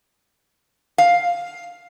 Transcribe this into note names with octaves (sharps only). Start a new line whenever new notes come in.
F5